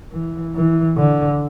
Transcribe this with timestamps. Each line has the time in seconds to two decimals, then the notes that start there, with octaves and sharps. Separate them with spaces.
0.12 E3
0.55 E3
0.97 D3